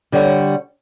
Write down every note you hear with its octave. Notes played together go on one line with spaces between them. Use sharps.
D3 G3 C#5 F#5